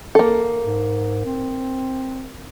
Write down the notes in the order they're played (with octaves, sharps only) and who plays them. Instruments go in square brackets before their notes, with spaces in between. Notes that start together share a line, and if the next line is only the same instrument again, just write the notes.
[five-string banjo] A#3 A4
[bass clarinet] G#2
C4